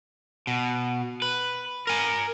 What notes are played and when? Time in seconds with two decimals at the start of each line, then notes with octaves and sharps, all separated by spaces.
0.47 B2
1.22 B4
1.87 A#4 G#5